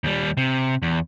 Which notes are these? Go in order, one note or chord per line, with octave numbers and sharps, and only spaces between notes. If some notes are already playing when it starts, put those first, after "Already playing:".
D#2 G3
C3
E2